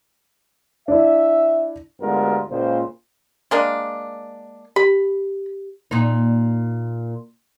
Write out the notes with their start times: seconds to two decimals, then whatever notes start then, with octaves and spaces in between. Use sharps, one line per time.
0.88 D4 E4 E5
2.01 D2 G2 G#3 B3 F4 A#4
2.50 C#2 A#2 C5
3.51 G#3 A#3 D4
4.76 G4 B5
5.91 A#2 D#4